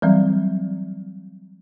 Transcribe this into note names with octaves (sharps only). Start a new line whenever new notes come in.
E3 F#3 G3 C4